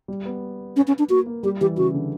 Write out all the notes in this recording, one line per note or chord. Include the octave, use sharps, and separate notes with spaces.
G3
B3
C#4
C#4
D4
A#3 F#4
A#3
G3 G4
E3 G4
C#3 F#4
D3